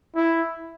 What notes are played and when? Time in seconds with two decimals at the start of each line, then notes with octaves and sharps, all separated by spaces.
0.16 E4